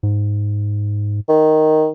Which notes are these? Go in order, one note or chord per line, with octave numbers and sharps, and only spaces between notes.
G#2
D#3